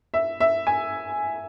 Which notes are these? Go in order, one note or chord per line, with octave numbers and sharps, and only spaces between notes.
E5
E5
G#5